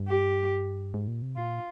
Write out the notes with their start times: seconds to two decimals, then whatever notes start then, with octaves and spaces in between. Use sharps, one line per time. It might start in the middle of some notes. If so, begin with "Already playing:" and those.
Already playing: G2
0.08 G4
0.94 G#2
1.08 A#2
1.22 C3
1.37 A#2 F4